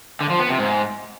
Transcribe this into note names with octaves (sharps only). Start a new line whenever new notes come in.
D3
F3
B3
C3
G#2